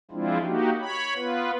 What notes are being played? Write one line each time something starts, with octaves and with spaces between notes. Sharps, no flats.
F3 G#3 C4 D4 E4 F4
A#3 D#4 F#4 G4
C#5 B5
B3 F4 B4